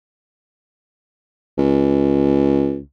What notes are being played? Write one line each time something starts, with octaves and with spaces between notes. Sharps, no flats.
C#2